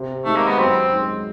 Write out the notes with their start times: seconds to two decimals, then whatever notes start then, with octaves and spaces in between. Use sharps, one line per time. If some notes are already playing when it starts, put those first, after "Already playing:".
Already playing: C3
0.25 D#3 G#3 A3
0.36 A#3
0.48 B3
0.59 F#2 C4
0.92 D#3 G#3